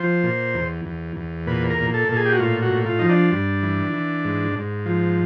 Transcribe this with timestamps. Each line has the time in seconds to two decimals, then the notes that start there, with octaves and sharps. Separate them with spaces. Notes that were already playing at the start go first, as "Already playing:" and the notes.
Already playing: F3 C5
0.23 A#2
0.54 E2
0.86 E2
1.16 E2
1.47 A#2 B4
1.70 A#4
1.78 A#2
1.94 A4
2.08 A#2 A4
2.17 G#4
2.25 G4
2.32 F#4
2.40 A2 F4
2.62 F#4
2.71 A2
2.86 F4
2.99 F3 D#4
3.09 D4
3.32 G2
3.63 E3
3.93 E3
4.24 G#2
4.56 G#2
4.86 F3